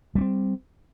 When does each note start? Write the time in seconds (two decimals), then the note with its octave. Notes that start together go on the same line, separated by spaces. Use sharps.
0.15 G3
0.18 B3
0.21 C4